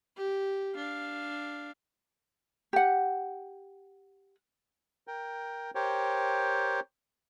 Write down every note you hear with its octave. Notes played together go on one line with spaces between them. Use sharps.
G4
D4 F5
G4 F#5
A#4 G5
G4 A#4 C5 C#5 G5